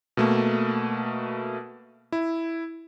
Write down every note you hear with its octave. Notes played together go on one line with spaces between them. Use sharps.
B2 A3 A#3
E4